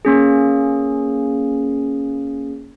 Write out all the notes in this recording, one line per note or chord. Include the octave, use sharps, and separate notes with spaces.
A#3 C#4 G#4